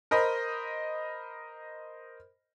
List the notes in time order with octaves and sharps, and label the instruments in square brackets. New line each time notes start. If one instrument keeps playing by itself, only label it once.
[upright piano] A#4 C5 D#5 B5